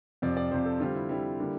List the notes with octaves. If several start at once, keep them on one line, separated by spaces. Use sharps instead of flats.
F2 C3 F3 D5
D5
F2 C3 F3 C5
A4
D3 G3 C4 F4
E4
D3 G3 C4 E4
D3 G3 A#3